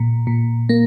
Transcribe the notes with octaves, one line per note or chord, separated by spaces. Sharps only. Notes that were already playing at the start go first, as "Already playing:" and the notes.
Already playing: A#2
A#2
A#3